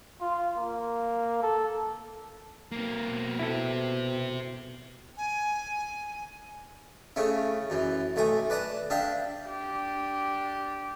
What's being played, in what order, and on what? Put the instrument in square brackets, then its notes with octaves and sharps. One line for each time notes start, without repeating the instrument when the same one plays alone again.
[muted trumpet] F4
A#3
A4
[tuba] B1 [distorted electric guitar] A#3 C4
[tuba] B2
[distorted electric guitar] C4 G4 [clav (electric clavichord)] E4 A4
[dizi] G#5
[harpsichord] C#3 A3 C#4 E4
F#2 E3
B1 A3 G#5 A#5
B4 D5 A5 A#5
D4 G4 E5 F5
[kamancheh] D4 G4